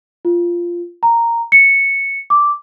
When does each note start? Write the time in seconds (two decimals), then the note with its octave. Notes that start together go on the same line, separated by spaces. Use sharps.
0.25 F4
1.03 A#5
1.52 C#7
2.30 D6